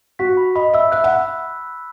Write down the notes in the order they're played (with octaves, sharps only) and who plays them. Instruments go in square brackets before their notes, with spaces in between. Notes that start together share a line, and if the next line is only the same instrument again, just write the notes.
[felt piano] F#4 [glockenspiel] B6
[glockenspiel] B5
[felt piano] D#5 [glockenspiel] B5
[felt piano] E5 [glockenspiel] E6
[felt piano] E5 [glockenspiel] F#6
[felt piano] F#5